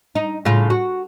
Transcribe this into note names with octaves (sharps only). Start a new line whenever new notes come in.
D#4
A2 C#3 F4
F#4